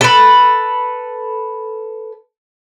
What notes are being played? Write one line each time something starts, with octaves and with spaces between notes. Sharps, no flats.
A4 B4